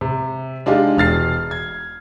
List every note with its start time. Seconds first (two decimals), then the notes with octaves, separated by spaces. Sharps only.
0.01 C3
0.66 G#3 D4 D#4 F4 G4
0.97 E1 F6 A6 C7
1.51 G#6